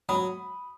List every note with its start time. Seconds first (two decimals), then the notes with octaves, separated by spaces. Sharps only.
0.09 F#3 B5 D#6